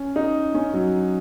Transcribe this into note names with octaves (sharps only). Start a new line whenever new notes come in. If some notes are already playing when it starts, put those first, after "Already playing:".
Already playing: C#4
D#4
C#4
F#3